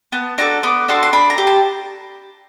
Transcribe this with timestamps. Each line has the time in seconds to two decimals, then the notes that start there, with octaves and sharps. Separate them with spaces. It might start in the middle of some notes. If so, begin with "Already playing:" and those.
0.12 B3 A5
0.38 D4 F#4 A4 A#5
0.63 B3 D6
0.88 D4 F#4 A4 C6
1.03 C6
1.13 D4 B5
1.30 A#5
1.38 G4
1.47 A5